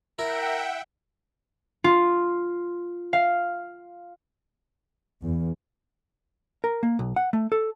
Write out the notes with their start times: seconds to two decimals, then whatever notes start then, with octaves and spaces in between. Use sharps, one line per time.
0.19 E4 A#4 E5 F#5 G5
1.84 F4
3.13 F5
5.22 E2
6.64 A#4
6.83 A#3
6.99 B1
7.16 F#5
7.33 A3
7.52 A4